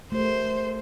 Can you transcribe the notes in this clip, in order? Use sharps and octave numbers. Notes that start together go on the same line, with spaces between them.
A3 G4 A#4 C5